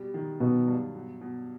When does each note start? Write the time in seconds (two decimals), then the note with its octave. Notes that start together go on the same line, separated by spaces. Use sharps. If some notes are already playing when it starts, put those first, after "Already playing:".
Already playing: B2 G3
0.14 D#3
0.40 B2 F#3
0.68 G2
0.94 B2
1.21 B2